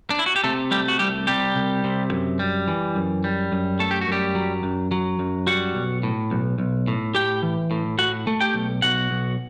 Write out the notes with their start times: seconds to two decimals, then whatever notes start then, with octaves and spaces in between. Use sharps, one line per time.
0.10 D4
0.19 E4
0.26 F#4
0.36 G4
0.44 C3 A3 A4
0.71 G3 A3 G4
0.88 F#4
0.99 C2 G3 G4
1.27 C3 G3 G4
1.56 C2
1.84 C3
2.11 F#2
2.39 G3
2.68 E3
2.95 F#2
3.24 G3
3.52 F#2
3.79 A3 A4
3.91 G4
4.01 F#4
4.08 F#2 G3 G4
4.35 F#3
4.63 F#2
4.91 F#3
5.19 F#2
5.47 G3 F#4 F#5
5.75 B1
6.03 A2
6.31 B1
6.58 B1
6.88 A2
7.15 A2 G4 G5
7.43 E3
7.71 A2
7.99 A2 F#4 F#5
8.27 A3
8.41 G4 G5
8.54 B1
8.82 B1 F#4 F#5
9.11 B1